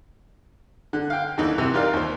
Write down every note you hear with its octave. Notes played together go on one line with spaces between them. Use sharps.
D3
F5 G5
D#2 D3 E3 D#4
C3 E3
D#4 F4 G4 A#4 D5 F5
D#2 C5